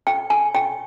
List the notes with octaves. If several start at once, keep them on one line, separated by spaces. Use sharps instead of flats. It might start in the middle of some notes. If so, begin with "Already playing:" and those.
G5
G#5
G5